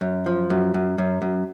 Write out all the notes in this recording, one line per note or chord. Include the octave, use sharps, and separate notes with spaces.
F#2
F3
F#2
F#2
F#2
F#2